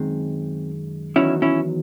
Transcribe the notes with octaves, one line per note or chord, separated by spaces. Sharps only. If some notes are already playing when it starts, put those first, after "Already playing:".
Already playing: F#2 D#3 G#3 C4
E2 D#3 F#3 C#4 E4
C#4 E4